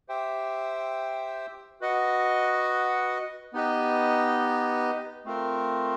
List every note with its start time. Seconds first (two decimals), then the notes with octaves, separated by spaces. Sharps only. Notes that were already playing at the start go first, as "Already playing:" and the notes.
0.09 G4 C5 E5 G5
1.81 F#4 B4 D#5 F#5
3.53 B3 D#4 G4 B4 D#5
5.25 A3 C4 F4 A#4